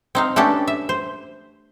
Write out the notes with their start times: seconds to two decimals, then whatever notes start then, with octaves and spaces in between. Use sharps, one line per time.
0.15 C4 D#4 F5
0.36 A3 B3 C#4 D4 G4 A4
0.67 E5
0.89 C5